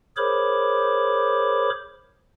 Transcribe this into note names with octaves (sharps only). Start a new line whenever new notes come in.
G#4 A#4 C5 C#5 B5 D6